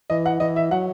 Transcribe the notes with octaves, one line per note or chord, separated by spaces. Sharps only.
E3 D#5
F#5
E3 D#5
E5
F#3 F#5